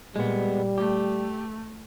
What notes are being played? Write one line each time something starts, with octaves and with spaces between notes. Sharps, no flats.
A#2 G3 G#3 B3
A3 G4